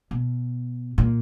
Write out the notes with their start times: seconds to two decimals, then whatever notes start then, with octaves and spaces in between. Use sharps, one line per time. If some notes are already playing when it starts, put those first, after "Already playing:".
0.11 B2
0.98 A#2